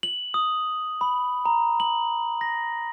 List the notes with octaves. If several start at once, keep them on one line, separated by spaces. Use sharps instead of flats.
F#7
D#6
B5
A#5
F#7
A#6